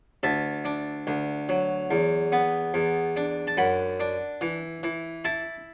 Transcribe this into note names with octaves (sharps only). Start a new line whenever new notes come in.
D2 E5 A5
D4
D2
F#3
E2
B3
E2
D4
A5
F#2 F#5 B5
D4
E3
E3
E4 E5 A5